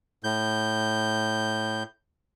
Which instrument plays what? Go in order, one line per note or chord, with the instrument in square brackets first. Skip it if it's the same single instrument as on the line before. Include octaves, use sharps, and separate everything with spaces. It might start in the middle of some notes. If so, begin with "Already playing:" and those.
[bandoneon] A2 G6